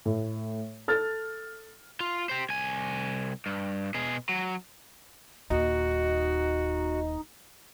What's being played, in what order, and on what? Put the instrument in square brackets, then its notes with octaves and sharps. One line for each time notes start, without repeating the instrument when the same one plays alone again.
[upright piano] A2
A4 F6 A6
[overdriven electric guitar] F4
G4 C5
C2 G#5
G2
B2 G#4
F#3
[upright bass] D#1 D#2 [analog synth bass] D#4 [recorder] F#4